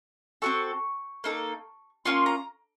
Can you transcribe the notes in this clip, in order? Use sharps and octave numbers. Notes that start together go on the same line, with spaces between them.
C4 F#4 A4 C#6
A#3 D#4 A4
A#3 C#4 F4 C6
A#5